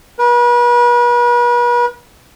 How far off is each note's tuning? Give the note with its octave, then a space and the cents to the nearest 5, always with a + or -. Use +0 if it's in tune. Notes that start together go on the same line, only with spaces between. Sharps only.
B4 -40